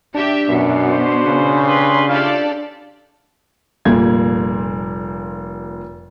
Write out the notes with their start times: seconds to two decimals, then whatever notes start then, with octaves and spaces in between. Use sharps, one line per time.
0.15 D4 G4 E5
0.49 F#2 B2
0.89 F#4 B4 C5
1.26 C#3
1.64 G4 B4 C6
2.08 E4 F4 G4 A4 D5 F5
3.85 F1 A#2 G3 A#3 G#6